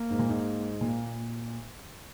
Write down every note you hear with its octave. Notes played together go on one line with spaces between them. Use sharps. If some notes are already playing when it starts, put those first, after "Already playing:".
Already playing: A#3
G#2
A#2
G#2
A#2 A#3